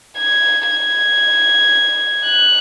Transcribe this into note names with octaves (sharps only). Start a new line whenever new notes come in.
G#6
G#6
F#6